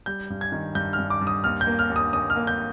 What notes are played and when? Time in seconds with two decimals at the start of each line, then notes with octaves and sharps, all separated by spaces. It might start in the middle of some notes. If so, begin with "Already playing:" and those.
0.06 G3 G6
0.30 G2
0.41 G#6
0.52 D#3
0.75 G2 G6
0.93 F6
0.98 G2
1.10 D6
1.21 G2
1.27 D#6
1.44 D#2 F6
1.61 G6
1.67 A#3
1.79 F6
1.90 D#2
1.96 D#6
2.13 D#2 D#6
2.30 F6
2.36 A#3
2.47 G6